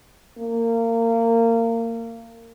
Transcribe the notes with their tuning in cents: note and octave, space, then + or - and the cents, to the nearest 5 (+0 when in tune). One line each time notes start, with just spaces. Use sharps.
A#3 -25